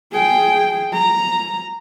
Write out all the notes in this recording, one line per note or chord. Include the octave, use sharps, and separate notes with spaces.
G#4 G5
A#5